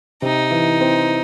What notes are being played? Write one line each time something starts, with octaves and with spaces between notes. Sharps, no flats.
C3 D#4
E3
C4